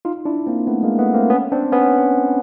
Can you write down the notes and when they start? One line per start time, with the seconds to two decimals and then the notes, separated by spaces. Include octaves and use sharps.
0.05 D#4 F4
0.25 D4 E4
0.47 A#3 C4
0.67 A3 B3
0.83 G#3 A#3
0.99 A3 B3
1.14 A#3 C4
1.30 B3 C#4
1.52 C4 D4
1.72 B3 C#4